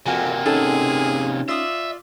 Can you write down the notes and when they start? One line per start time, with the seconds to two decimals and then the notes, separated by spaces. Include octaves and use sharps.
0.06 F2 C3 A#3 F#4 G5 G#5
0.46 C#4 D#4 G#4 A4 F#5
1.48 F4 D5 E5 D#6